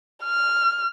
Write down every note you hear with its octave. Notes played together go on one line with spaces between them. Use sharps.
F6